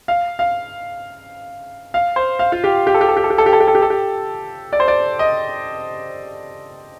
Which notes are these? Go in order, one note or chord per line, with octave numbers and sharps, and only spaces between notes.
F5
F5
F5
C5
F5
F4
G4
G4
A4
G4
A4
G4
A4
G4
A4
G4
A4
G4
A4
G4
A4
G4
D5
C5
D5
D#5